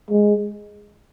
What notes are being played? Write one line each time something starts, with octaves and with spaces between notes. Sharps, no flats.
G#3